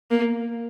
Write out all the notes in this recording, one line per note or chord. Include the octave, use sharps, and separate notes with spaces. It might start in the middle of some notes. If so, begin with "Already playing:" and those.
A#3